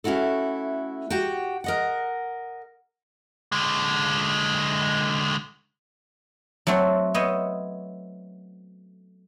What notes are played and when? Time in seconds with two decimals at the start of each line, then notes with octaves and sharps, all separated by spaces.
0.04 A3 C#4 E4 F#4 A4
1.10 F#4 G4 F#5 G5
1.64 A#4 D#5 F#5
3.52 D3 G#3
6.67 F#3 A3 C4 F#4 A4
7.14 B3 C5 C#5 D#5 E5